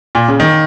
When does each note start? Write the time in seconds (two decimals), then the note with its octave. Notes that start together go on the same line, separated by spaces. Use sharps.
0.15 A#2
0.28 C#3
0.40 D#3